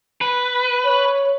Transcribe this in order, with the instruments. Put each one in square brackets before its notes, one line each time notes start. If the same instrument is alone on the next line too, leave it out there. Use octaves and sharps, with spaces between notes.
[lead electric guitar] B4
[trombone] C#5